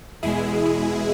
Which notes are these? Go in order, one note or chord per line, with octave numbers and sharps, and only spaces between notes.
E2 B2 G#3 E4 G#4